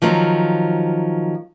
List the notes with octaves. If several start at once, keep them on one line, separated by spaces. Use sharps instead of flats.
D#3 F3 F#3 C4